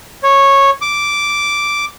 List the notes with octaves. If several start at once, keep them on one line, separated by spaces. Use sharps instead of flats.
C#5
D6